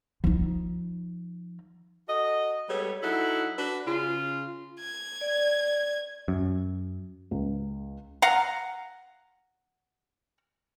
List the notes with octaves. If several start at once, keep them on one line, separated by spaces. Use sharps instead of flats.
F3 D#4
F#4 A4 D#5
G3 G#3 B3 A4 C#5
F#3 D#4 E4 A4 F#5
D4 F#4 B4
C#3 F4
G#6
D5
F#2
C#2
F5 F#5 A#5